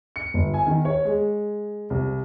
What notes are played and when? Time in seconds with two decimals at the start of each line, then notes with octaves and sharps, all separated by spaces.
0.16 C#7
0.34 G1
0.54 G#5
0.67 D#3
0.85 C#5
1.05 G#3
1.90 C2